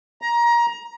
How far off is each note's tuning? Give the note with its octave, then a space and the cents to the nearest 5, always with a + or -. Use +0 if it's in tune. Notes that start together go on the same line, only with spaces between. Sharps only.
A#5 +20